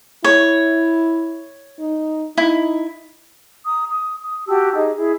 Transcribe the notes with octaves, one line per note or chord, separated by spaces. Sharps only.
E4 C#5
D#4
D#4 E4
A#5 D#6
D#6
D#6
F#4 G4 A5 E6
D#4 G4 G#4 D#5
E4 G#4